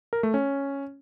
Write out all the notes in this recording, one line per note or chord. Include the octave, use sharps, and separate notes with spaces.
A#4
A3
C#4